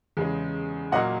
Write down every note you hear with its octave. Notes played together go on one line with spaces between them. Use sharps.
E2 C#3 G#3
A#2 F#3 A#3 D#5 F#5